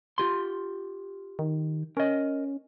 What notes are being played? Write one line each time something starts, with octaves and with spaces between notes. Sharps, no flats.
F4 G4 C6
D#3
C#4 A#4 D#5